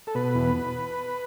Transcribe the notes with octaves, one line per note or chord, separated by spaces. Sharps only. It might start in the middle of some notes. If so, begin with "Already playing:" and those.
A4
B2 B4
E2